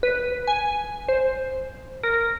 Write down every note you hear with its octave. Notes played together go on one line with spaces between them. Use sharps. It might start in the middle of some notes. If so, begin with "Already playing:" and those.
B4
G#5
C5
A#4